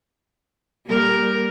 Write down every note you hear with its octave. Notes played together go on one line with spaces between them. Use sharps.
G3 A#3 A#4